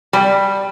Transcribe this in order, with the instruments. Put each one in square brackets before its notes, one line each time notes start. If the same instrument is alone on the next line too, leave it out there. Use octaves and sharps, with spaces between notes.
[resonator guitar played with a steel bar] G3